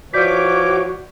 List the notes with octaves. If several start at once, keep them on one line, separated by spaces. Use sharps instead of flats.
E3 F3 F#4 C#5 D5 D6 G6 B6